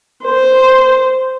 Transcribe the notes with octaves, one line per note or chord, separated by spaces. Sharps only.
C5